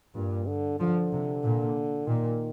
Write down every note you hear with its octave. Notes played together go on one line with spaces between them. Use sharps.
G2 A#2
D3
D3 F3
C3
A#2
A#2 D#3